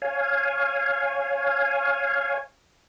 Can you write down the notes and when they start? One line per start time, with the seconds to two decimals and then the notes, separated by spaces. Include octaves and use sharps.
0.02 C#5 F5 G#5